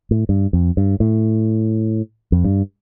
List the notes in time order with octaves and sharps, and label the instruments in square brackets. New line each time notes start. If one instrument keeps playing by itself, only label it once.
[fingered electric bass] A2
G2
F2
G2
A2
F2
G2